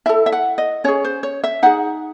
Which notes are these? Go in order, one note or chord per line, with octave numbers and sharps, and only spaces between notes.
E4 A4 E5
E5
F#5
D#5
C#4 G#4 C#5
C5
C#5
E5
D#4 G#4 F#5